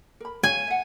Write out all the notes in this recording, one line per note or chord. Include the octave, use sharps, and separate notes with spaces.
A#4 B5
C#5 F5 G#5
E5 F#5